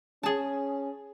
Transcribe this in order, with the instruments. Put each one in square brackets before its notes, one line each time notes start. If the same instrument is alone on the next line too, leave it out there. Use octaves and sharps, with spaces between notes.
[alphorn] C#4 [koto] G#4 A5